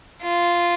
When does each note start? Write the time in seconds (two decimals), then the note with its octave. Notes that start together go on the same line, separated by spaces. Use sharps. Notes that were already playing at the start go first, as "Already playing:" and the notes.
0.22 F4